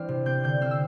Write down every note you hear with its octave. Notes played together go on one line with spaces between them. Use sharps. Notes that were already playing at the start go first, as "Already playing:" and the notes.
Already playing: E3 C4 D4 F6
C3
C4 G6
D3 G6
C4 F6
E6